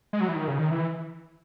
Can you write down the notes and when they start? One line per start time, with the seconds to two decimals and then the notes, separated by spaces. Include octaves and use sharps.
0.13 G#3
0.21 F#3
0.28 E3
0.36 D#3
0.48 C#3
0.59 D#3
0.71 E3